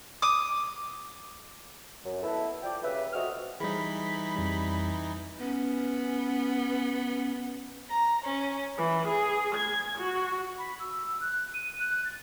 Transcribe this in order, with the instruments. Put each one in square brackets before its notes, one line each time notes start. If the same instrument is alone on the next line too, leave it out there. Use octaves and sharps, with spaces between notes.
[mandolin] D6 D#6
[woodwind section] F#2
B2 E4 A4
F3 D5 G5
G2 C#3 B4 E5
F2 C4 F#4 D#5 E5 F6
[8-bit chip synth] E3 D#4 [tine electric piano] G3 G#4 [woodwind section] B5
[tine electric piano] F2 G3
[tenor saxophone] B3 [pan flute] C#4
[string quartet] A#5
C#4
E3
G#4
G#6
F#4
[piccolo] B5
E6
F#6
D#7
F#6
A6